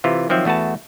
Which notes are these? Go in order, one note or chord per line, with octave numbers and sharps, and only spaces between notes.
C3 E3 F4
D#3 F3 F#3 C4 E5
E2 A3 F#4 B4 A5